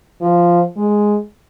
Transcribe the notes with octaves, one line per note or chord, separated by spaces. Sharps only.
F3
G#3